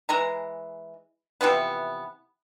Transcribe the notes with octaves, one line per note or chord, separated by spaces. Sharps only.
E3 G#3 A#5
C3 E3 F3 B3